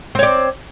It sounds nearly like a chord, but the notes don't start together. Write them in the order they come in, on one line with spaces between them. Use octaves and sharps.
C4 C#5 D5